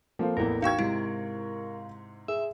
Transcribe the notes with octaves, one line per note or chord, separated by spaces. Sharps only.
F3 A#3 C4 A4 F5
A1 E2 E3 A#4
D#4 F#4 F5 G5 C#6 G#6
G#2 C3 E4
G#4 E5